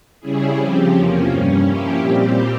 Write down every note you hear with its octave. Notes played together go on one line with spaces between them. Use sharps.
C#3 G3 C#4 E4 G#4
C#3 F3 C4 G4
E2 C3 F3 A#3 C#4
G2 G3 C#4
F3 A#3 C#4 E4 G4
A#2 G3 C4 G4